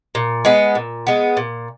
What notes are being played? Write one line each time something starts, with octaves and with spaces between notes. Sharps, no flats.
A#2
G#3 B3
A#2
G#3 B3
A#2